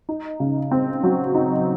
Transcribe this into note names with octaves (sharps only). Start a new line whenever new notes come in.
D#4
C#3
C4
F#3
D#4